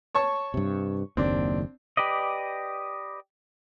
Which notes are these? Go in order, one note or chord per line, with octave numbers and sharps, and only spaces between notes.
C#5 A5 C#6
G2 C3
F#1 D#2 C4 D4
G4 B4 D5 D#5